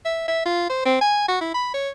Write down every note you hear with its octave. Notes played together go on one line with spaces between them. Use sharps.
E5
E5
F4
C5
C4
G#5
F#4
E4
B5
C#5